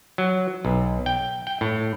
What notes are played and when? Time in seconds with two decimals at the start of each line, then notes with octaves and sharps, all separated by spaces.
0.18 F#3
0.65 B1
1.06 G5
1.47 G5
1.61 A2